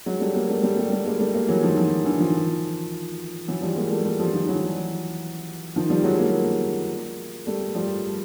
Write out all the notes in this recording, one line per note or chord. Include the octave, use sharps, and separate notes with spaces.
F#3 G#3
G3 A3
G#3 A#3
G3 A3
G3 A3
G3 A3
G3 A3
G#3 A#3
G3 A3
G#3 A#3
E3 F#3
D#3 F3
D#3 F3
D3 E3
D#3 F3
E3 F#3
F3 G3
G#3 A#3
G3 A3
G3 A3
F3 G3
D#3 F3
E3 F#3
D#3 F3
F3 G3
F#3 G#3
G#3 A#3
G3 A3
F3 G3